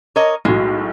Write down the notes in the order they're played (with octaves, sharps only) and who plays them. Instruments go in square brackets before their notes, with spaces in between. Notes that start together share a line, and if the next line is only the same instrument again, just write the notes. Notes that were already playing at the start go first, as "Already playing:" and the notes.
[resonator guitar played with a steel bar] A#4 C#5 D#5
[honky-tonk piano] B1 A2 F#3 [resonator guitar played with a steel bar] G#3